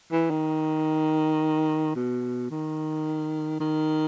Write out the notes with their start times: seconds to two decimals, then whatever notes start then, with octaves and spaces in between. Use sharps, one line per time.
0.12 E3
0.30 D#3
1.95 B2
2.51 D#3
3.60 D#3